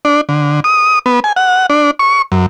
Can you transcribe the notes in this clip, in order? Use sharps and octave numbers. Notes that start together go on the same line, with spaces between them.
D4
D3
D#6
B3
G#5
F#5
D4
C#6
F#2